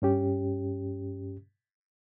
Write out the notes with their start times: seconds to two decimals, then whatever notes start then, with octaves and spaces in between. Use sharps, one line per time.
0.02 G2 C#4 G4